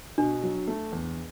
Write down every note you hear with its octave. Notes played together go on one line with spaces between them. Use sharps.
B2 D4
F#3
A3
E2